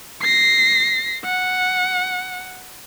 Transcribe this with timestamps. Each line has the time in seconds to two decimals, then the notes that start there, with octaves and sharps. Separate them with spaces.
0.22 A#6 C7
1.25 F#5